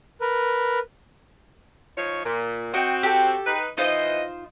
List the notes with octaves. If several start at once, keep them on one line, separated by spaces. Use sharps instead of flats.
A#4 B4
F3 D#4 C#5
A#2
C4 F#4 D#5 G5
G4 A4
D#4 B4
E3 D#4 F4 C5 D#5